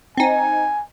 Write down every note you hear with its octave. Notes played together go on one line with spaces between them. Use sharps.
C4 D#4 G#5